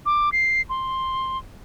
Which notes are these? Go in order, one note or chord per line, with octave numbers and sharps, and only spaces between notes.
D6
C7
C6